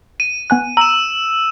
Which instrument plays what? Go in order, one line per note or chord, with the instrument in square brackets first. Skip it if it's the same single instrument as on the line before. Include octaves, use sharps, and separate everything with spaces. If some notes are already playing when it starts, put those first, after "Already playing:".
[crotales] D#7
[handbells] B3 G#5 F#6
[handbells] A#5 [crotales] E6 E7